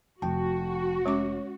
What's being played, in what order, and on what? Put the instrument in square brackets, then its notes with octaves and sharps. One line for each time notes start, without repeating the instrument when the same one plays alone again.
[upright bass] F1 [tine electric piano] F3 G5 A5 [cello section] F#4
[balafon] G#3 C#4 D6 [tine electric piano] C#5